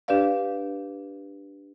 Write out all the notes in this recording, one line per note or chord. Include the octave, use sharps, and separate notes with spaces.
D4 G4 B4 D5 F5